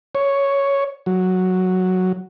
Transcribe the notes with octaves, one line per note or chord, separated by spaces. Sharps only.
C#5
F#3